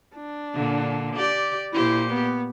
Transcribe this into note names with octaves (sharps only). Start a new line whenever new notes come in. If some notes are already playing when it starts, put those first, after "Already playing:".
D4
A#2 D3
G4 D5
A#2 E4 G4 C5
B3